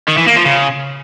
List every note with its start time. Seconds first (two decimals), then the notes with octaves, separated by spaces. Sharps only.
0.08 D#3
0.18 E3
0.27 A#3
0.36 F3
0.46 C#3